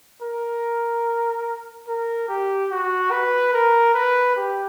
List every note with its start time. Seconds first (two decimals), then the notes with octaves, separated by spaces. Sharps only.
0.21 A#4
1.87 A#4
2.28 G4
2.70 F#4
3.11 B4
3.53 A#4
3.94 B4
4.36 G4